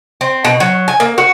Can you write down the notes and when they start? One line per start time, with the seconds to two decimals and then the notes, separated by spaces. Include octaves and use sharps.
0.21 C4
0.45 B2
0.60 F#3
0.88 G#5
1.00 A#3
1.18 F#4